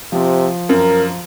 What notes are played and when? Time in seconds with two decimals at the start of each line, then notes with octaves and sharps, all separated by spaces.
0.12 C3 F3
0.69 F#2 A#4